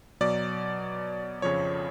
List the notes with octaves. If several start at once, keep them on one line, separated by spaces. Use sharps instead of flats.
B2 F#3 D5
F2 C#3 F3 C#5